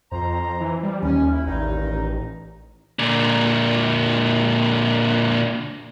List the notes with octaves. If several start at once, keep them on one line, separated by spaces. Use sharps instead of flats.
F2 C5 A#5
E3
G3
D#2 C#4
E4
A1 G2 D#3 D#4
A#2 D3